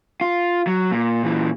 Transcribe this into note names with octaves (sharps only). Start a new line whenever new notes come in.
F4
F#3
A#2
A#2 E3